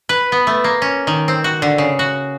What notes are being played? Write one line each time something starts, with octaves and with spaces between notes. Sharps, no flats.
B4
B3
A3
A#3
C#4
D#3
C4
F#4
D3
C#3
F#4